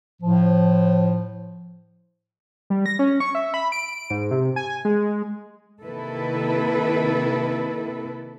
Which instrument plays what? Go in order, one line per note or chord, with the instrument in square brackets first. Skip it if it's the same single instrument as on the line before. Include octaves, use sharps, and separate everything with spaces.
[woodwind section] A2 F3
[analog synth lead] G3
A#6
C#4
C#6
E5
B5
D7
G#2
C3
G#5
G#3
[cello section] C3 D#3 A#3 E4 A4 B4